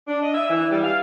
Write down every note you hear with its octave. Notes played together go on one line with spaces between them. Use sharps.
D4
D#5
E5
E3
G3
F5